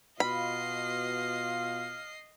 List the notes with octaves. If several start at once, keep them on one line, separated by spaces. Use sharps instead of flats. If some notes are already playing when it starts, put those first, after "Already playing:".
B2 F4 D#5 F5 B5 C7